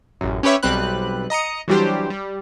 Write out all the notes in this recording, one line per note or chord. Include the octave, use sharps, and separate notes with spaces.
A1 F#2
C#4 G4 B4 C#5 E5
B1 G3 C4 B4 F#6
D#5 A#5 D#6 C#7
E3 F#3 G3 D4 G4 C5
G3